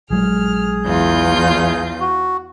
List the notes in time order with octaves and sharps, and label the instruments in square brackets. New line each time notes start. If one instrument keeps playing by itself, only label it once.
[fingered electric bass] A#1 F#3 G#3 [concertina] G#4 [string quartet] F6
[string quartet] E2 F4 G6
[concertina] F#4